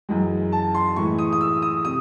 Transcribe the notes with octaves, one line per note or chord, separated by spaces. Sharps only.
F#2 E3 G#3
A5
C6
A2 E3 G#3 C#6
D#6
D#6
E6
D#6
C3 D#6